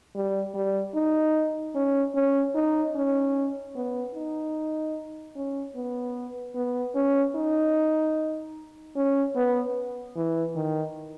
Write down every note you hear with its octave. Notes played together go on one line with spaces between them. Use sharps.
G3
G3
D#4
C#4
C#4
D#4
C#4
B3
D#4
C#4
B3
B3
C#4
D#4
C#4
B3
E3
D#3